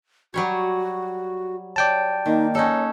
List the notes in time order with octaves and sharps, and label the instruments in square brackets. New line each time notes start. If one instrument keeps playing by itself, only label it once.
[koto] F#3 G3 C#5 [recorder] F#4
[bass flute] C#5 [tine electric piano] D5 G5 A5
[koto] D#3 [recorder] A#3 [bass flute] D#4
[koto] C#4 D#4 A4 [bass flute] C#5